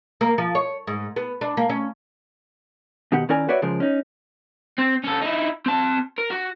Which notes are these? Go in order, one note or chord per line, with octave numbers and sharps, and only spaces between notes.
A#3
F3
C#5
G#2
B3
D4
A#3
C#4
B2 D#3 G4 F#5
D#3 C#4 E4 A#4 D5 G#5
F#4 B4 C#5 D5 E5
C#3 F3 G#3 A#4
C#4 D#4
C4
C#4 A4
D#4 E4
C4 A5
A#4
F#4